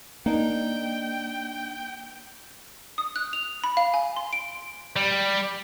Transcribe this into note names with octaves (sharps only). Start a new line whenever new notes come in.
A#3 D4 D#4 G5
D#6
F#6
F7
B5
F5
G#5
C6
D7
G3